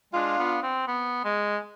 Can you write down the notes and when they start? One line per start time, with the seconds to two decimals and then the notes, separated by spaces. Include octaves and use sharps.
0.14 G#3 D4 F4
0.38 B3
0.63 C4
0.88 B3
1.24 G#3